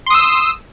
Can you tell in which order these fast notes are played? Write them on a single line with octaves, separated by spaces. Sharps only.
C6 D#6 E6